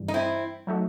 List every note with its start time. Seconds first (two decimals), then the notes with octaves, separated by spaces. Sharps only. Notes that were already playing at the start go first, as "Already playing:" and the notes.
Already playing: G2 E3 G3
0.08 D#4
0.14 C4 E4
0.67 F#3 A3 D#4 F#4